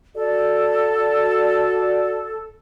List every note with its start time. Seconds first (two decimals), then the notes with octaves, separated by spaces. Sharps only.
0.15 F#4 A4 D5